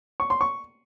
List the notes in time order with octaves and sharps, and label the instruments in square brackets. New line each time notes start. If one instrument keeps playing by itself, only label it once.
[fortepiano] C#6
C6
C#6